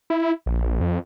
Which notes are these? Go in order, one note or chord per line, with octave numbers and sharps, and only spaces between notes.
E4
A#1
F2